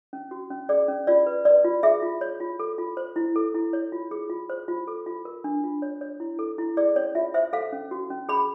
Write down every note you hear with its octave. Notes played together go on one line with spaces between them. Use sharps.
C#4
F#4
C#4
G#4 D5
C#4
F4 D5
B4
B4 D5
F4
G#4 E5
F4
C#5
F4
A4
F4
C5
E4
A4
E4
C#5
F4
G#4
F4
C5
F4
A4
F4
A#4
D4
F4
C#5
C#5
E4
A4
E4
G#4 D5
C#4 C#5
F4 E5
C5 E5
A4 F5
C#4
F#4
C#4
G#4 B5